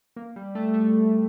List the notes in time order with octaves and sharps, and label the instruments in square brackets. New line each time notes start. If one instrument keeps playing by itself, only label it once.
[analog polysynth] A#3
G3
A3
A3